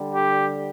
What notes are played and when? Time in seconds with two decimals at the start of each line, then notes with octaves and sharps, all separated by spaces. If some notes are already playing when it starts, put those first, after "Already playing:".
Already playing: D3 G3
0.15 G4